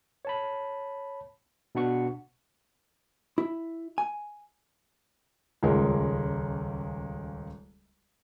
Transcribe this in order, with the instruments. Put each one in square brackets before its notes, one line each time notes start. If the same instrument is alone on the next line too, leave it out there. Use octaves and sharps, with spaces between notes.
[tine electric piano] C#5 A5 B5
B2 D4 F#5 C#6
[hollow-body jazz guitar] E4
G#5
[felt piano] D#1 C#2 G#3 A#4